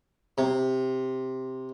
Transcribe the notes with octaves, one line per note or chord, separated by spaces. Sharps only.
C3